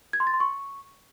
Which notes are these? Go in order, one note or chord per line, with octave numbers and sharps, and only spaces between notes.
G#6
C6
A6
C6
C#6